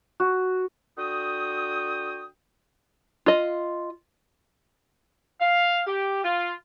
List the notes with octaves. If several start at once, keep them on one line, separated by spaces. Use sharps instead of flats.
F#4
D3 F#4 G5 D#6
F4 D#5
F5
G4
F4